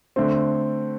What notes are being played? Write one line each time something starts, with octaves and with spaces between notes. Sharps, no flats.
D3 A3 C4